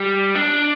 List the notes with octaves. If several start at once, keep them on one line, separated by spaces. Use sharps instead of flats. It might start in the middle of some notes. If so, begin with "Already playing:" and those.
Already playing: G3
D4